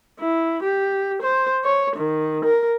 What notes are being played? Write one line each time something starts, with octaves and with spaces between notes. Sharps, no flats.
E4
G4
C5
C#5
D#3
A#4